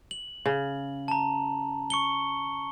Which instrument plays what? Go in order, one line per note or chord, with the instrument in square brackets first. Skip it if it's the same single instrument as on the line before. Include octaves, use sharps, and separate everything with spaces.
[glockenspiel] F#7
[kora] C#3
[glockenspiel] A5 A#5
C#6 C#7 G7